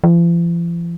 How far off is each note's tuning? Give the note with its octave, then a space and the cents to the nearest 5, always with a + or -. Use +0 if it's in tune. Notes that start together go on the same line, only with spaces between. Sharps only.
F3 -45